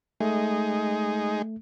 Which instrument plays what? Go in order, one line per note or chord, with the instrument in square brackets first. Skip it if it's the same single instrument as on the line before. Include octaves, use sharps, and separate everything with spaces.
[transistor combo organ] G#3 D#4 G#4 [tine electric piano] A3